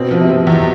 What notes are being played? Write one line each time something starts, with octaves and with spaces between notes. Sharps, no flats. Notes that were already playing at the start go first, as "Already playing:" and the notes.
Already playing: B2 C4
F3
C3
F3
E2 C3